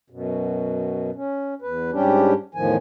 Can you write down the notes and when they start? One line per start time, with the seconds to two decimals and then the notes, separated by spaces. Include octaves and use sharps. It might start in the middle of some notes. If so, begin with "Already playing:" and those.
0.10 F#2 B2
1.15 C#4
1.62 E2 B4
1.92 G#2 G3 C#4 D4 G4
2.55 E2 A2 D#3 F3 G#5